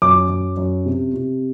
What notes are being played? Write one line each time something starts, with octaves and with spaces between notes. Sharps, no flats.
F#2 D6
F#2
F#2
C3
C3